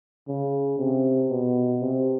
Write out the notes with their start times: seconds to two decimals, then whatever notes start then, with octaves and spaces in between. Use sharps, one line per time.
0.28 C#3
0.79 C3
1.30 B2
1.81 C3